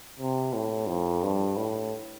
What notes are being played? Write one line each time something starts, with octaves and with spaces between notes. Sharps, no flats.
C3
A2
F2
G2
A2